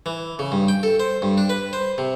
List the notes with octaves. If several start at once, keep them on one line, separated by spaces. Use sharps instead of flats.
E3
C#3
G2
G5
A4
C5
G2
D4
B4
C5
C3